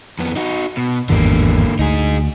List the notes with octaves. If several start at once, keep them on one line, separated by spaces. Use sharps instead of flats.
F2 B3
D#4 F#4
B2
G#1 E2 G2 D3 A#3
D2 D#4 G#4